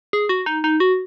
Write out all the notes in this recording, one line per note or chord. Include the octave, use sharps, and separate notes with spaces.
G#4
F#4
D#4
D#4
F#4